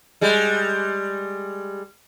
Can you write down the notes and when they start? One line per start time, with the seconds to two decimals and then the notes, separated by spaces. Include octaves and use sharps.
0.21 G3 G#3